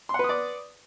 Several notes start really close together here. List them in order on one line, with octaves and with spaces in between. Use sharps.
C6 F#5 B4 D#6 D5